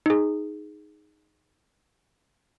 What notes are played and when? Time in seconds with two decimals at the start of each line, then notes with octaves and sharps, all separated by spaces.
0.06 D#4 G#4